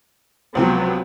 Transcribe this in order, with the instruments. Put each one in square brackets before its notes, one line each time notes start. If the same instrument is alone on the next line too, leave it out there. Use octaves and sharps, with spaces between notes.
[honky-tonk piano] C#2 C3 F3 [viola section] F#3 B3 C4